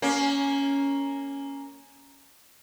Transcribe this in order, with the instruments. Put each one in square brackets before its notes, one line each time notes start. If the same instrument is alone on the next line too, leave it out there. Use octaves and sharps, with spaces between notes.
[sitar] A#3 C#4